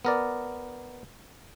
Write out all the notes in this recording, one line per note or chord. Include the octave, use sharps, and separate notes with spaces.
B3 A#4 D5